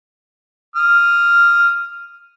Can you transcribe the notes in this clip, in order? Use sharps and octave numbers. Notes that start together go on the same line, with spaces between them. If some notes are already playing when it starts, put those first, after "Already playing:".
D#6 F6